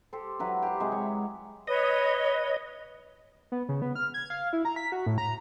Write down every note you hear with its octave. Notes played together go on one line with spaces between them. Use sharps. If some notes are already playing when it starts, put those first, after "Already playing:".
G4 A4 C5
F#3 E4 B4 A#5
G4 C5
C3 F#3 G#3
C#5
B4 C#5 D#5
B3
C#3
B3
F6
G#6
F5
E4
A#5
B6
F#4
A2
A#5